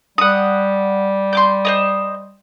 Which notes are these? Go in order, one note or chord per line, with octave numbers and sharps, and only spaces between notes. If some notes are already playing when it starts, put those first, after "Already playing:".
G3 F#5 D#6
C6 D6 G6
C5 C#5 D#5